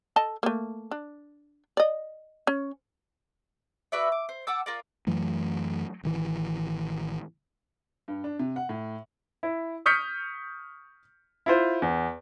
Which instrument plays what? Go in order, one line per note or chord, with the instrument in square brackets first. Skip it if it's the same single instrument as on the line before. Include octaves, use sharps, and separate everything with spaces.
[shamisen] A4 D#5 A5
A3 A#3
D4
D5 D#5
C#4
[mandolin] F#4 B4 D5 E5
D6
C5
F#5 A5 D6 E6
F4 A#4 D5
[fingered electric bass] F#2 E3 F#3 A3
A1 D#3 E3
[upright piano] G2
D4
C3
F#5
A2
E4
C#6 D#6 F6 G6 B6 C#7
E4 F4 C5
E2